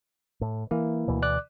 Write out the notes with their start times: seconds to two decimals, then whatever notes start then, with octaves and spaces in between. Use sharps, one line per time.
0.41 A2
0.71 E3 A#3 E4
1.08 D2 B2 E3
1.22 D5 D6 F#6